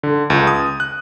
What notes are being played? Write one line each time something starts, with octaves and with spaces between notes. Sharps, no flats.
D3
C#2
D#6
F#6